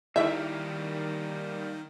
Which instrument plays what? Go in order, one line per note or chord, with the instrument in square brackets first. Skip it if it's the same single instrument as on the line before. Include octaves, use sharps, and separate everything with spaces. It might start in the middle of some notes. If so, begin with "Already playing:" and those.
[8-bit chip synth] D#3 [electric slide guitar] G3 A#3 [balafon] E4 [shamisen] E5